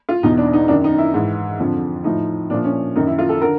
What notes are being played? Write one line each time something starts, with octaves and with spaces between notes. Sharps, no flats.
F4
E2 B2 D#4
D4
D#4
F#2 D#3 D4
D#4
E4
G#2 E3
F2 D3 F3
A2 F3 D#4
A#2 F3 D4
C#4
F#2 D#3 D#4
E4
F4
A4
D3 A#4